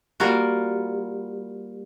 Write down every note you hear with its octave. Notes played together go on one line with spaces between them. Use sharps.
G3 A#3 F4 F#4